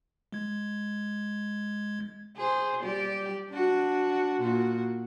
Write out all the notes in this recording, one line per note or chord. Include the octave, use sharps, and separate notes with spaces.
G#3 G#6
G#4 C5
G3 G4 D5
D4 F#4
A#2 F#4